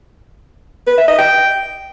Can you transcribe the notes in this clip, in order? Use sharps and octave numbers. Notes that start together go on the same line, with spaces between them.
B4
E5
D#5
G5